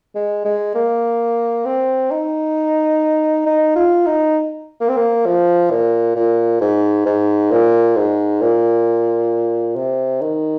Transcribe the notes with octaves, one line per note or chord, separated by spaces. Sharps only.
G#3
G#3
A#3
C4
D#4
D#4
F4
D#4
A#3
C4
A#3
F3
A#2
A#2
G#2
G#2
A#2
G#2
A#2
C3
D#3